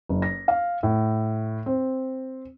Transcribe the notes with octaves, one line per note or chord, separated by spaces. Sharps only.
F#1
A#6
F5
A2
C4